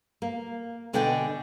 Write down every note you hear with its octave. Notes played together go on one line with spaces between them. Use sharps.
A#3
B2 D3 D5 D#5 G5 G#5